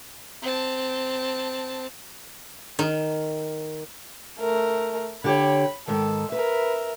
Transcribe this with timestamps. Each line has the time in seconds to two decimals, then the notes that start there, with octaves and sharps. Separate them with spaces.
0.42 C4 A5
2.79 D#3
4.40 A3 A#4
5.24 D3 G4 C#5 B5
5.88 G#2 D#3 A4
6.32 A#4 B4 E5